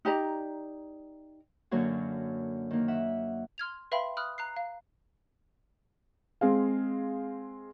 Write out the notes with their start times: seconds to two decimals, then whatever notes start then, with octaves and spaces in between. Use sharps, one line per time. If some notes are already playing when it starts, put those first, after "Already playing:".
0.05 D#4 G4 D5 A#5
1.71 F#2 D3 F#3 A#3 F#4
2.71 D#3 A#3
2.88 E5 F#5
3.58 C6 F6 G#6 F7
3.92 B4 E5 F5 G5 B5 C6
4.17 B5 D#6 F6 F#6
4.38 A#5 F#6 C7
4.57 F5
6.41 G#3 C4 G#4 F5